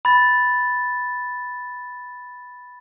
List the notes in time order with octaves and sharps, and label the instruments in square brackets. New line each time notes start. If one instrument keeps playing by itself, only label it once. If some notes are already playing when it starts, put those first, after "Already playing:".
[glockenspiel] B5 A6